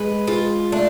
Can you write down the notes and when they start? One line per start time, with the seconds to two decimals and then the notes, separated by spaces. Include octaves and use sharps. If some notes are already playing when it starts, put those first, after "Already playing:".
Already playing: G#3 B4
0.27 G#3 F4
0.72 A3 D4